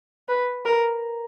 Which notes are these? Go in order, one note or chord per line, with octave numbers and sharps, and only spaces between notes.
B4
A#4